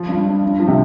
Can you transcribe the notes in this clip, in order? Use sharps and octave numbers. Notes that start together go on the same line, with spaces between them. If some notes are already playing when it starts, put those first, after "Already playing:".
Already playing: F3
G2
G2
G2
F3
C3